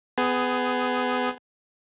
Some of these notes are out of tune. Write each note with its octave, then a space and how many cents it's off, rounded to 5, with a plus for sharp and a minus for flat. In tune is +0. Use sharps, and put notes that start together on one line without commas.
B3 +25 G#4 +0